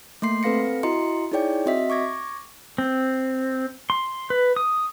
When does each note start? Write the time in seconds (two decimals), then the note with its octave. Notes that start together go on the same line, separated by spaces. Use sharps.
0.22 A3 A#3 C6 C7
0.43 C4 A4 B4 F5 A#6 C#7
0.83 E4 F#4 D#5 A#5 C6 C#7
1.32 D#4 E4 G#4 C#5 D5 G5
1.66 C4 F#4 D#5 E5 B6
1.90 C#6 D6 G#6 A#6
2.78 C4
3.90 C6
4.30 B4
4.56 D#6